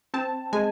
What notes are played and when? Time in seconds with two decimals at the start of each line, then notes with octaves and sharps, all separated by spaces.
0.14 C4 A5
0.53 G#3 G#5